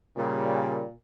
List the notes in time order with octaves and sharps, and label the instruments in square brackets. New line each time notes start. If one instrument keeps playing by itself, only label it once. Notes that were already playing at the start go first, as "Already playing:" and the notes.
[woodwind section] A#2 [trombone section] C#3 G3